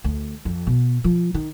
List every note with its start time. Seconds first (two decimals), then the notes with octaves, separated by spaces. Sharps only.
0.04 D2
0.45 F2
0.67 B2
1.04 F3
1.34 D#3